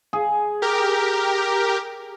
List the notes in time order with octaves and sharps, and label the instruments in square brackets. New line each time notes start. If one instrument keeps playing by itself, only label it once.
[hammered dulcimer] G#4
[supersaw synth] G4 A#4